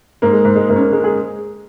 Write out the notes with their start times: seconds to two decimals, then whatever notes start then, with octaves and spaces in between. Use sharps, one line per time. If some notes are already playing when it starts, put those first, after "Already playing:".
0.22 G#2 A#3
0.33 G#3
0.45 G#2
0.56 G#3
0.69 G#2 A#3
0.76 C#4
0.81 A#3
0.92 G#3 C#4
1.04 G#4